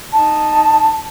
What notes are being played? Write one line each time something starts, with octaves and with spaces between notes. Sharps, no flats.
D#4 A5